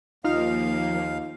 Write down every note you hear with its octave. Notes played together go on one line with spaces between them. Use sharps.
D#2 F3 A#3 D#4 F4 F5 F6